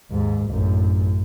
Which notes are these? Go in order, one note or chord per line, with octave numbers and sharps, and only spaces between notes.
D#2 G#2
A1 F#2